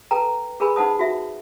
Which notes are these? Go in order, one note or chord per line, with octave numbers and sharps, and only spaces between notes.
A4 B4 G5 A#5
G#4 A#4 B4 G#5 B5
D#4 C5 F#5 A5 D#6
F#4 E5